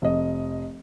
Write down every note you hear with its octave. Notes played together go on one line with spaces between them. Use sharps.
F1 D#5